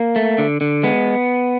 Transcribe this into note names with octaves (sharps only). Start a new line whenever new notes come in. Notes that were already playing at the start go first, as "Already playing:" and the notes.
Already playing: A#3
A3
D3
D3
G#3 B3